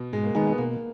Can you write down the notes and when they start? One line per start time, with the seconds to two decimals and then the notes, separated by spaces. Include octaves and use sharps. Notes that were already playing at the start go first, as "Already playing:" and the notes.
Already playing: B2
0.13 G#2 G#3
0.24 A#3
0.35 D#3 G#3 B3 D#4 G#4
0.47 B3
0.58 B2 A#3